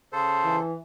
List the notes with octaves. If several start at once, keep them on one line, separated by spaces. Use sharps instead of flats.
C#3 A4 C5
E3